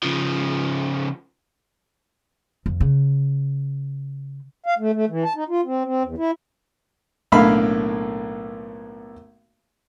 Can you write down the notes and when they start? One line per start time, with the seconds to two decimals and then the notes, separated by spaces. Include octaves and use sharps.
0.03 C#3 F3
2.66 F2
2.80 C#3
4.66 F5
4.79 A3
4.94 A3
5.09 E3
5.24 A5
5.36 D#4
5.49 F4
5.65 C4
5.85 C4
6.03 E2
6.18 E4
7.32 B1 A2 D3 A#3 F5 B5